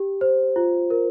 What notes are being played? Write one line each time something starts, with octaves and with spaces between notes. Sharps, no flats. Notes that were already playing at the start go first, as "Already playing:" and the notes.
Already playing: G4
C5
F4
A#4